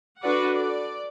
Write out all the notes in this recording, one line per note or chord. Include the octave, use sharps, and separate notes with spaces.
D4 F#4 A4 B4 D5 F#5
D5